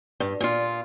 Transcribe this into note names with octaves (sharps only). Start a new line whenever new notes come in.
G2
A#2 F4